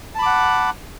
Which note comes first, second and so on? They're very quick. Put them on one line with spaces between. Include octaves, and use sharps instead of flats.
A5 B5 D6 F#5